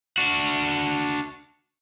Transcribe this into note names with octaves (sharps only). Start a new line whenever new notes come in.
D4 F#4